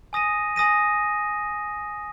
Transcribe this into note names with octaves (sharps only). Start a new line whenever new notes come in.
G#5 D#6 A#6 D#7
G#5 D#6 A#6 D#7